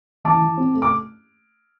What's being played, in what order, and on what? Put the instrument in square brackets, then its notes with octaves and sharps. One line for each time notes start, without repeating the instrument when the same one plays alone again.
[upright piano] E3 A5 D6
E3
C4
A3
D6